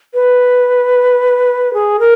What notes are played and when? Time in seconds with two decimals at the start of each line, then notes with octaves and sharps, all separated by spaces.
0.14 B4
1.74 G#4
1.99 A#4